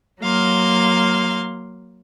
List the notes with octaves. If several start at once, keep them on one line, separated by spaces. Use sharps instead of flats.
F#3 A#3 F5 C6